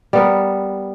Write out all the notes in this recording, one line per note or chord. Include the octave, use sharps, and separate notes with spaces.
G3 B3 A#4